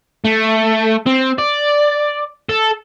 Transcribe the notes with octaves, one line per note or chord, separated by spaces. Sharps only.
A3
C4
D5
A4